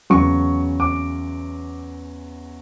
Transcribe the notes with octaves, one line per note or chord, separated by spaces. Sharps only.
E2 C#3 F#3 C#6
D6